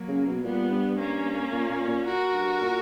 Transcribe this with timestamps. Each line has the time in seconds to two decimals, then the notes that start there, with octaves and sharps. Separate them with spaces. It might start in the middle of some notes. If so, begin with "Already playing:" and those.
Already playing: F#3 A#3
0.08 C#3
0.27 B2
0.44 A#2 G3 B3
0.71 G2
0.98 A#3 C#4
1.52 A#2
1.70 A#2
1.88 A#2
2.06 F#4 A#4
2.33 G2
2.61 A#2